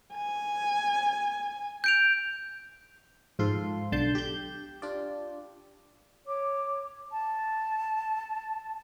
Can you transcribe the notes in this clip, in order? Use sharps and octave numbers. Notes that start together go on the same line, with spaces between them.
G#5
G6 D7 F7
G#2 F3 F4 A4 C6
B1 D3 A5 C6 G6
G4 G6
D4 F4 G4 D5
C#5 D6
A5